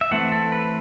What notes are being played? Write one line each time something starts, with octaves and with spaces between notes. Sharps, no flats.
E5
E3 A3 C4 F#5
A4
B4